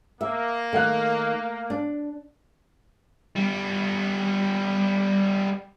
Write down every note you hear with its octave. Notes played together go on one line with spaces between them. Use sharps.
A#3 E5
D#3 A3 F5 F#6
D4
G3 B3